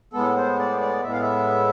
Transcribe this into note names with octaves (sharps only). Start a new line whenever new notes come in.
A2 G#3 B3 A4
C5
D5
D5
A2 G#3 B3 E5
F5
E5